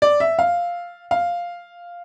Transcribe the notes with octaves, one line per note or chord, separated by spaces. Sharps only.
D5
E5
F5
F5